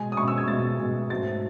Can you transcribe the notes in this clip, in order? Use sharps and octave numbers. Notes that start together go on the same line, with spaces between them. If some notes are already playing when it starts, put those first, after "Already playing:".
Already playing: B2 G#3 G#5
D#6
B2 G#3 C#6
E6
G#6
B2 G#3 A6
B2 G#3
G#2 F#3 A3 A6